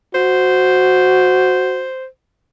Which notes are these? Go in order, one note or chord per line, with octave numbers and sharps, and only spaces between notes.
F#4 C5